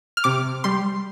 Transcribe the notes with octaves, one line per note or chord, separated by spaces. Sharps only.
F6
C3 D6
G3 C6